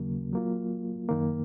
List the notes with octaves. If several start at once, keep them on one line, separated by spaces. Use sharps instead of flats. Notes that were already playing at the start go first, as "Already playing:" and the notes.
Already playing: D#2 C#3 F#3 A#3
F#3 A#3 F4
F#2 D#3 A#3